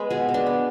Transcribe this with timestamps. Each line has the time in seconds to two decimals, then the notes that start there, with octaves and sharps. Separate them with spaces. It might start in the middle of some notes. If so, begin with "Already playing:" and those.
Already playing: G#3 B3 B4
0.10 B2 G#4
0.29 B2
0.34 D4
0.47 B3